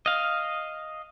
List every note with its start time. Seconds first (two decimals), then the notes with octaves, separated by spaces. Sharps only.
0.06 D#5 F5